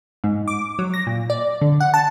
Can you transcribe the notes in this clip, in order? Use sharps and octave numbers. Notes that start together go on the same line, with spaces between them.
G#2
D6
F#3
A#6
A#2
D5
D3
F#5
A5